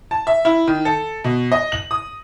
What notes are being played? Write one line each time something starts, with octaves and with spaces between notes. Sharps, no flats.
A5
E5
E4
D#3
A4
B2
D#5
F#7
D#6